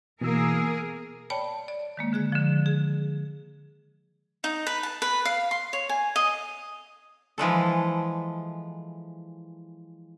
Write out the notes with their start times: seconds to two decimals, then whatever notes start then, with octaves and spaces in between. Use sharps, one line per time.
0.21 B2 E3 A#3 G#4 A#4 E6
1.30 C#5 D5 G5 A5 B5
1.68 D5
1.97 D#3 G#3 A#3
2.13 D3 G#4 F#6
2.32 D3 F3
2.66 G#4
4.44 D#4
4.67 B4
4.83 A5
5.02 B4
5.25 F5
5.51 C6
5.73 C#5
5.89 G#5
6.16 D#5
7.38 E3 F3 G#3 A4